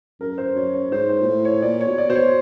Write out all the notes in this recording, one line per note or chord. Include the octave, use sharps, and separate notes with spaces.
F#2 A#4
C5
F#2 C#5
C#5
G#2 C5
C5
A#2
A2
C#5
A#2 D5
C#5
B2
D5
B2 C5
C#5